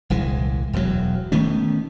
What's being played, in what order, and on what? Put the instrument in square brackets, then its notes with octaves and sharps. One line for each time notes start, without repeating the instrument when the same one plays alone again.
[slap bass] D#1 C2 E3 G#3
E1 E2 G#2 F#3
D#3 A3 B3 C#4